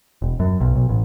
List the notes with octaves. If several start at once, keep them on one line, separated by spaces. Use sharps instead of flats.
E1
F#2
B1
B1
A1